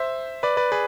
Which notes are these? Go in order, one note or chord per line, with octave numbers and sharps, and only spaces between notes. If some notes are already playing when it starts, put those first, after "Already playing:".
Already playing: C5 E5
B4 D5
B4 D5
G#4 B4